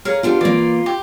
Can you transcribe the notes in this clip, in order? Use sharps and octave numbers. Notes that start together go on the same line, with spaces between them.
G#4 A#4 C#5 F5
B3 D4 F4 G4
E3 A#3 D5
G4